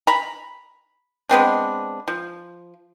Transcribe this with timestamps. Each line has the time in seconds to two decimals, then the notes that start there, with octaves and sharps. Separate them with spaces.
0.07 A#5 B5
1.29 G#3 B3 C4 D4
2.08 F3